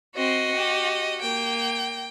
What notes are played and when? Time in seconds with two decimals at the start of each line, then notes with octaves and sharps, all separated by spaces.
0.16 C4 F#4 D#5 C6
0.55 G4
1.22 A#3 G5